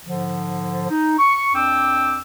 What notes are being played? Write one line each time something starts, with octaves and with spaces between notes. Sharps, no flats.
G#2 D3 F3
D#4
C#6
F2 D4 G5 D6 E6